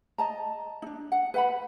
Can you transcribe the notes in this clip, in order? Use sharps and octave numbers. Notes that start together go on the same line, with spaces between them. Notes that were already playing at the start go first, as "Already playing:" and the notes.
D#5 A5 A#5
D4 D#4
F#5
B4 F#5 B5